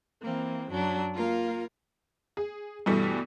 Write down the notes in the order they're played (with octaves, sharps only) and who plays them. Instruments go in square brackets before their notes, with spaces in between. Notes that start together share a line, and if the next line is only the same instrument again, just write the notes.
[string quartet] E3 A#3 C4
F#2 F#3 D4
A#3 F4 A#4 F5
[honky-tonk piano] G#4
G2 B2 E3 G3 A3